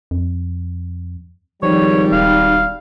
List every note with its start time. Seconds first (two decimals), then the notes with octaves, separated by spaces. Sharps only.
0.11 F2
1.63 G#1 F3 G3 D#4 C#5
2.12 D1 F5